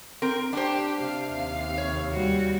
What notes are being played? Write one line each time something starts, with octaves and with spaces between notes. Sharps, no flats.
C4 A#4
D4 G4 C5
C3 F5
D#2
C#5
G3 F#4